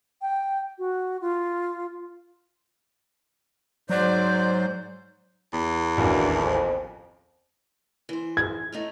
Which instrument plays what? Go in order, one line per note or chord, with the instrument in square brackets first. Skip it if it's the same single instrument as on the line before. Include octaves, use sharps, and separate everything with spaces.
[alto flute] G5
F#4
F4
[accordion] G#2 C5 [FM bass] F#3 [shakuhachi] D5
[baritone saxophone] E2
[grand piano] A1 D#2 A#3 [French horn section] B2 D4 E4
[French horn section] F2
[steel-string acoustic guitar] E3 C5
[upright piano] G#6
[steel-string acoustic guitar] A2 A3 D#4